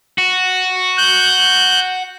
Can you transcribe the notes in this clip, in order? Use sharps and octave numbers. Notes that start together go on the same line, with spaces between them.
F#4
F#6 G6